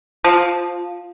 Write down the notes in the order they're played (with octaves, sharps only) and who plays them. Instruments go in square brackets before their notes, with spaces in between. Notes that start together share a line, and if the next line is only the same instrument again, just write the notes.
[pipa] F3